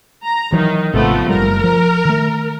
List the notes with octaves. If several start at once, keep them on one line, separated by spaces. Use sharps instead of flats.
A#5
D#3 E3 F#3 D#4
G#1 C3 F3 A3 B3
F#1 G3 A#4
F3
D#3 A3